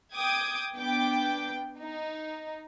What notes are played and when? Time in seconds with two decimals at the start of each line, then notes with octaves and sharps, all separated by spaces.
0.15 G5 D6 D#6 G#6
0.75 B3 D4 G5 D6
1.80 D#4